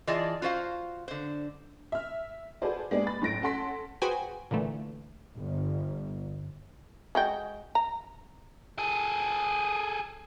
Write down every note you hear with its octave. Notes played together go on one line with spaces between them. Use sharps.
E3 F4 G#4 D5 D#5 A5
F4 F#4 C5 F5
D3 C5
E5 F6
F#4 G#4 A4 B4 C5 D5
G#3 A#3 B3 D4 G4 D5
B5 A6
F#1 A2 A#6 D7
C#4 A4 F#5 C6 B6
F#4 G#4 B4 C5 G5 G#5
A#2 D3 E3 A3
G1
G#3 F#4 G5
A#5
G#4 A4